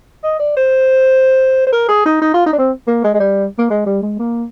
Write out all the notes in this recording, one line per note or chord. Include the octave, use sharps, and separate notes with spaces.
D#5
D5
C5
C5
A#4
G#4
D#4
D#4
F4
D#4
D4
C4
A#3
G#3
G#3
G3
A#3
G#3
G3
G#3
A#3